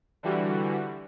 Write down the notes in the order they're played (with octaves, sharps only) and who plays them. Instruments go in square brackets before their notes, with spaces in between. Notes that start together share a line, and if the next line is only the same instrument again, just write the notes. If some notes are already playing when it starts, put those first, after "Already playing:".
[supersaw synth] D3 E3 G3 F#4